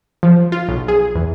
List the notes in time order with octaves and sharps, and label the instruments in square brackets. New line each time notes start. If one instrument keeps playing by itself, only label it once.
[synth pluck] F3
F4
B1
G#4
E2